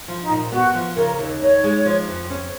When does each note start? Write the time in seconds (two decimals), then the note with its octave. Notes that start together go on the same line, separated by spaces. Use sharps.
0.08 F3
0.23 D#4
0.30 A#2
0.52 B3 F#4
0.75 F3
0.97 C#3 A#4
1.19 D#2
1.41 D#4 C#5
1.64 G#3
1.85 F3
2.08 F2
2.30 C#4